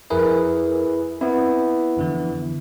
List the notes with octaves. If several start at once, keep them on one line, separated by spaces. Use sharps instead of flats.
F2 E4 G#4 A#4 B4
B3 C4 E4
F2 D3 E3